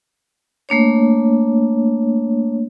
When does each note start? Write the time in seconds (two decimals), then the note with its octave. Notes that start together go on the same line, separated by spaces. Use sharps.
0.69 A3 A#3 D4 C#5